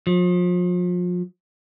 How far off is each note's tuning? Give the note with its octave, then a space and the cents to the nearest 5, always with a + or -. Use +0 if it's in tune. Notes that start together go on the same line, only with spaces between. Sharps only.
F3 +35